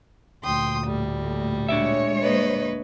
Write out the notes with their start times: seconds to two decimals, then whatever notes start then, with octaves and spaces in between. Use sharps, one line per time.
0.45 D2 A#2 G5 C6 D#6
0.86 A2 G3
1.69 G#3 D4 C#5 D5 E5
2.22 A#3 B4 D#5